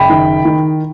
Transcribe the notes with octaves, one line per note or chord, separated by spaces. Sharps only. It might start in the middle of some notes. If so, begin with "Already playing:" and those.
Already playing: F#1 G5 B5
D#3
D#3